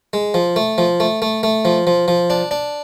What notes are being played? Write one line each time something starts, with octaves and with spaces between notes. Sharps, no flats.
G#3
F3
A3
F3
A3
A3
A3
F3
F3
F3
D4
D4